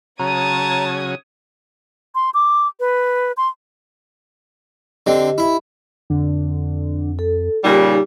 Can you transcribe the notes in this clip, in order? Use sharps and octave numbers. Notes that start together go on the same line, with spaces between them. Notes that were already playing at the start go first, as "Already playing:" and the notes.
C#3 F#3 C#5 A5 A#5 D#6 G#6
C6
D6
B4
C6
D3 C4 G4 D#5
E4
F2 D3
A4
A#2 C#3 G3 D#4 G4